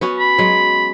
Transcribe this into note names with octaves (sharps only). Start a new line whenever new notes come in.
B3 C#4 F#4
B5
F#3 G#3